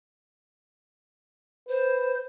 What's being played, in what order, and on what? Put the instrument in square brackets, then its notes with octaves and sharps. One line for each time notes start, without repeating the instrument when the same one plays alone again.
[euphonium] B4 [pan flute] C5